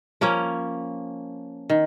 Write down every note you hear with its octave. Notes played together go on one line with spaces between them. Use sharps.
F3 A#3 C#4
D#3